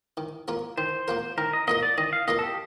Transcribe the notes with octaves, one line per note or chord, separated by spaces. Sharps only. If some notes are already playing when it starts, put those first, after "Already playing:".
D#3
A#3 F4 A#4
D#3 C5
A#3 F4 A#4
D#3 A#4
D#5
A#3 F4 A#4 D#5
D5
D#3 D#5
F5
A#3 F4 A#4 D#5
A4
G4